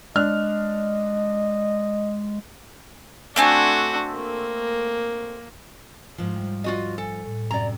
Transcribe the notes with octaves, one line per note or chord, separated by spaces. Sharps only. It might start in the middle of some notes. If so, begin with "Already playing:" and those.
G#3 D4 D#5 F6 F#6
A3 C4 D4 F#4 G#5
A#3
G#2 F3
G3
F4 F#4 D#5
A4 G#5
A2
F#2 C3 D5 A#5